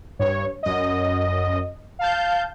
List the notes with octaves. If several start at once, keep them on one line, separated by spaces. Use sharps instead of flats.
G2 C#5
F#2 D#5
F5 A5 G6